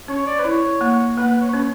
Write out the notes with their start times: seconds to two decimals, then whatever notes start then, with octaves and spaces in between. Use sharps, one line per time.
0.08 C#4 C#5
0.27 D5
0.39 B4
0.45 E4 C#5
0.81 A#3
1.17 A#3 B4
1.41 C#5
1.49 B4
1.53 C#4 C#5